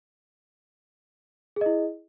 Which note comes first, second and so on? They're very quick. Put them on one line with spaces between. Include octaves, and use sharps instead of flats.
G#4 D#5 E4